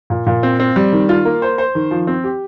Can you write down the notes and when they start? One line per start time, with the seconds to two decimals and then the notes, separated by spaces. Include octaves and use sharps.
0.10 A#2
0.27 A#2
0.43 C4
0.60 C4
0.76 G3
0.92 D#3
1.09 F4
1.25 A#3
1.42 C5
1.58 C5
1.75 D#3
1.91 F3
2.07 C4
2.24 G4